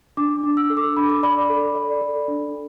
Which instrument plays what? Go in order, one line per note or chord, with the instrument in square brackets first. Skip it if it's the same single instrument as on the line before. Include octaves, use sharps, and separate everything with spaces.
[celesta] D4 D6
D4
E6
A4
D6
D4 B5
D6
D5 B5
A4
D5
A4
D4